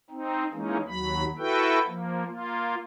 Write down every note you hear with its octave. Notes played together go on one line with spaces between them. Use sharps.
C4 D#4
E3 G#3 A#3 C#4 D#4
D#2 F#3 B5
E4 F#4 A4 B4 G5
F3 A#3
A#3 F4